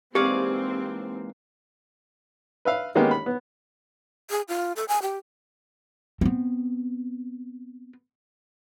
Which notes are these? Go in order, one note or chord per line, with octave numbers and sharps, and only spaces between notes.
G#2 E3 A#3 C4 G4 G#4 D5 F5
B4 E5 F5
D#3 G#3 A#3 B3 C#4 G4
B5
B3
G#4
F4
A4
G#5
G4
B3 C4